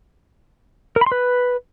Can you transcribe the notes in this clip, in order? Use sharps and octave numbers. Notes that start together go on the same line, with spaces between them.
A#4
B5
C6
B4